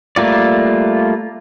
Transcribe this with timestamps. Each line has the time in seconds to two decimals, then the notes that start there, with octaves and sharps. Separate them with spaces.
0.16 G3 A3 A#3 F4 D5